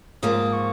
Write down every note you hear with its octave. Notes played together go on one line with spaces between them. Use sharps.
G#2 F3 A#3 D#6
C#6